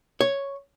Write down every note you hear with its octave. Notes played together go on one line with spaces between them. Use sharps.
C#5